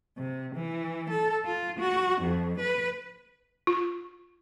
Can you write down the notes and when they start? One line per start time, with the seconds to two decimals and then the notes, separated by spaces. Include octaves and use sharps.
0.17 C3
0.55 E3
1.10 A4
1.44 F4
1.78 F#4
2.21 F2
2.59 B4
3.67 F4